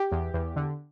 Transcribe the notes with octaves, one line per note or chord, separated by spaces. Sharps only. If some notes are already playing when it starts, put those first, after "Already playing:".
Already playing: G4
E2
E2
D3